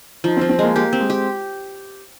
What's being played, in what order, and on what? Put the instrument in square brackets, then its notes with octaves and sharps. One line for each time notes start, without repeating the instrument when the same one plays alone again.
[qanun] F3 [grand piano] D#4
[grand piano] C4
[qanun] F3
[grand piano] C4
[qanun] G#3 [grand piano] A#3
[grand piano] A#3 [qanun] G4
[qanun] C4
[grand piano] G#3
[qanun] G4